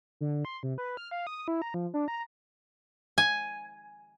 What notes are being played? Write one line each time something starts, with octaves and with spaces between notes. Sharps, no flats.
D3
C6
C3
B4
F6
F5
D#6
E4
A#5
F3
D4
A#5
G#5